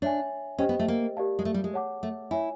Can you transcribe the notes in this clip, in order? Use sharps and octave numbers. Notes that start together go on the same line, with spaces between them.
D4 C#5 E5 G#5
C#4 G4 C5 D#5 G5
B3
A3
A#3
G4 A#4 D5 F5 A5
G#3
A3
G3
G#3
C#5 F#5 A5 D6
A3
E4 C#5 E5 G#5